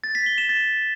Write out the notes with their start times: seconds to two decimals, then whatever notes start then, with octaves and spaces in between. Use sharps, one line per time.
0.04 A6
0.15 B6
0.26 G7
0.38 E7
0.49 A6